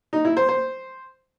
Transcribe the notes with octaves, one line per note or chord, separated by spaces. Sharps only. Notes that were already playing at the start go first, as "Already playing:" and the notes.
D#4
E4
C5
C5